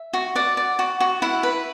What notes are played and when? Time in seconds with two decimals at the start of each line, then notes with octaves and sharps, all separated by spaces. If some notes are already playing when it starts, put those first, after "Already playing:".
Already playing: E5
0.13 F#4
0.35 D5 F#5
0.57 D5
0.79 F#4
1.00 F#4
1.22 E4 F#5
1.43 B4